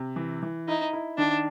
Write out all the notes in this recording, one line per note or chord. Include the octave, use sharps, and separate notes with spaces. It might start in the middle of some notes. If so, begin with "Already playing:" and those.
Already playing: C3
E3
E3
D#4 E4
E4
D#3 D4